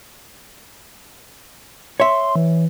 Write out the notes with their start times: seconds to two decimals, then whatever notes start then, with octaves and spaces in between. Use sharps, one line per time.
2.00 C#5 E5 C6
2.36 E3